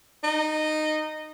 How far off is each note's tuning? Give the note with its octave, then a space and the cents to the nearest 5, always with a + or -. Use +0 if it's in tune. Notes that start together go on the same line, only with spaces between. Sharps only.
D#4 -15